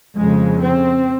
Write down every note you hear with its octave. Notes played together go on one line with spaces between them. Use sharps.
F2 C#3 G#3
C4